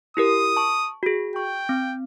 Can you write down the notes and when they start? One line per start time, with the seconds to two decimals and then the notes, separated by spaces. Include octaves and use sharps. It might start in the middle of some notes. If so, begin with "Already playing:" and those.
0.17 E4 G4 A#4 D#6
0.57 A5 C#6
1.03 F#4 G#4
1.36 G5 C#6
1.69 C4